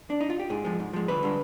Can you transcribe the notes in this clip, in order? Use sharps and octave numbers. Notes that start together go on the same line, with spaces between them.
D4
D#4
F4
G4
G#2 G#4
F3 G#3
G#2
F3 G#3
D2 B4
D3 G3